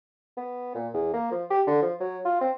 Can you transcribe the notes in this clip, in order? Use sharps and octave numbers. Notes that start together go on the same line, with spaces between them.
B3
A#2
E2
A#3
F3
G4
D3
F3
F#3
F4
C4